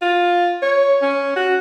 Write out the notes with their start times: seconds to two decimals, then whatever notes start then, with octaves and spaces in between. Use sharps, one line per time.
0.01 F4
0.62 C#5
1.02 C#4
1.36 F#4